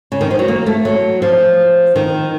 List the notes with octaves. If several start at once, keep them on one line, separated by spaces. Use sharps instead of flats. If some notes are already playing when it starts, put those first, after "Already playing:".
C#3
D#3
F3
F#3
A#3
A3
F#3
F3
D#3